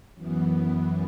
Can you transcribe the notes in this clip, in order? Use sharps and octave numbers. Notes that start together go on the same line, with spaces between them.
F#2 E3 B3